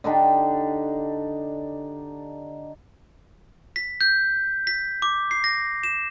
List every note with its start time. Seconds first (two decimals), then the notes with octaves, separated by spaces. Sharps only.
0.04 D3 D4 D#4 G4
3.76 B6
4.01 G6
4.67 B6
5.02 D6
5.31 C7
5.44 A#6
5.83 E7